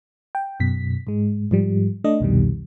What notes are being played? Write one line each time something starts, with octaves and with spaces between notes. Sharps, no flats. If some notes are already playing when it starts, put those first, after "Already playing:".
G5
F#2 B2 B6
G#2 G#3
G#2 F3 G3
A3 D4 D#5
C2 F2 B2 D#3 G3